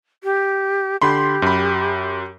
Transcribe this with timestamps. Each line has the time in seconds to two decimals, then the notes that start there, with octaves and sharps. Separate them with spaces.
0.24 G4
1.02 D3 G4 B5 C6
1.42 F#2 B5